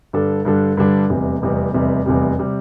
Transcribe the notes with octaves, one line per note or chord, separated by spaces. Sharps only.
G2 D3 G3 D4 A4
G2 D3 G3 D4 A4
G2 D3 G3 D4 A4
F1 E2 C3 G3
F1 E2 C3 G3
F1 E2 C3 G3
F1 E2 C3 G3
C3 G3